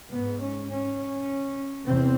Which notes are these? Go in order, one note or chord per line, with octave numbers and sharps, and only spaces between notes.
G#2 B3
C#4
C#4
E2 C3 C4